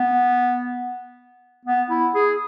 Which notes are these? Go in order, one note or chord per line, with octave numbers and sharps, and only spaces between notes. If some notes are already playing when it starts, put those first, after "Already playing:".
Already playing: B3
B3
E4
G#4